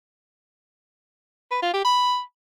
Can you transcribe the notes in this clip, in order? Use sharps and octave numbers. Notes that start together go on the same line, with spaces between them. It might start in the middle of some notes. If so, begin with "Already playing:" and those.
B4
F4
G4
B5